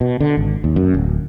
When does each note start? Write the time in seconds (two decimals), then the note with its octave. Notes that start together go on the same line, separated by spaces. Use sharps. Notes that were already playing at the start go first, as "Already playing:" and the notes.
0.01 B2
0.20 D3
0.37 G#1
0.64 D#2
0.76 F#2
0.94 D1